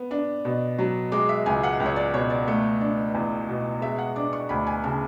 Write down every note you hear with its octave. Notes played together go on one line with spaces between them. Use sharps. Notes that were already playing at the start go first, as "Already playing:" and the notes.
Already playing: B3
D4
B2
F#3
G#3 D6
E5
C#2 G#5
F#5
C#2
C#5
D5
B2 C#5
D5
A3
D4
E2
B2
G#3 E5
F#5
D4 D6
C#6
D2 B5
G#5
C#3 A5